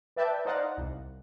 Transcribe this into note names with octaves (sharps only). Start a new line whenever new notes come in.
B4 D5 E5 G5 A5 G6
D#4 C5 D5 D#5 F5 F#5
C2